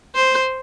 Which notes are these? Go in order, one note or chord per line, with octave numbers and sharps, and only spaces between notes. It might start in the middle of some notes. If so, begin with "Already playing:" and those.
C5